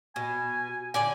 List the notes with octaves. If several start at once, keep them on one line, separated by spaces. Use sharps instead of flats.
B2 G#5
D3 D5 G#5